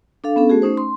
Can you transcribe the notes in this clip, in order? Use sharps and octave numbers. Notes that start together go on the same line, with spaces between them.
D4 A4 F5
B3 C#4 A4
A3 F#4 G#4
A3 C#4 D#4 C5
C6